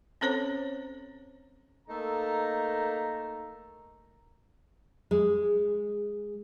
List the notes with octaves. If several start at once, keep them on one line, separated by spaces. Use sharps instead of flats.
C4 C#4 A4 C5 C#5 A#5
A3 A#3 D#4 A4 A#5
G#3